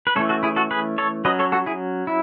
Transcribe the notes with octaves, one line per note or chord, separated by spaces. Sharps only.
B4
E3 A3 C#4 A4 C#5
F#4 A4
E4 G#4
F#4 A4
G#4 B4
A4 C#5
F#3 C#4 B4 D#5
A4 C#5
F#4 A4
E4 G#4
E4